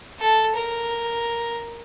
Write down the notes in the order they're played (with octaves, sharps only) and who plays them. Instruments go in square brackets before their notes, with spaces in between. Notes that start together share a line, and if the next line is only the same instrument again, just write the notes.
[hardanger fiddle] A4
A#4